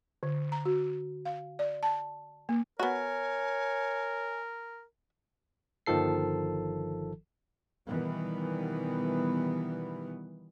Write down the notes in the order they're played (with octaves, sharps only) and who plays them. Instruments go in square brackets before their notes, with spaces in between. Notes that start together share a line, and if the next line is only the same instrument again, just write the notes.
[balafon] D3
A#5
F#4
F5
D5
A5
A#3
[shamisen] B3 F#4 [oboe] A#4 [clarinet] C#5 [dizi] G#5
[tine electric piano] G1 D#3 F3 A4 C7
[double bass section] B2 D#3 E3 G3 B3